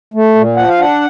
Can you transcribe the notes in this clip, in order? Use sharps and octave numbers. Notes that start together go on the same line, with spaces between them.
A3
A#2
F3 F#5
F5
D4 F#5